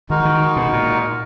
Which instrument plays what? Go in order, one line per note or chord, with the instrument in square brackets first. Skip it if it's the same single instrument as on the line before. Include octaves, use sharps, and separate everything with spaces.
[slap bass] D#3 [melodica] G#3 D#4 F#4 A#4
[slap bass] D#3
B2
A#2